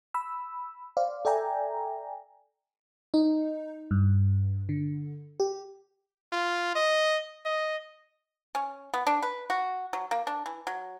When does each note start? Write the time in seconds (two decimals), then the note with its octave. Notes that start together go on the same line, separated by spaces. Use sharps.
0.14 B5 E6
0.97 C5 D5 F5
1.25 A4 D5 E5 G5 G#5 A#5
3.14 D#4
3.91 G2
4.69 D3
5.40 G4
6.32 F4
6.75 D#5
7.45 D#5
8.55 C#4
8.94 B3
9.07 D4
9.22 B4
9.50 F#4
9.93 F#3
10.11 A#3
10.27 D4
10.46 E3
10.67 F#3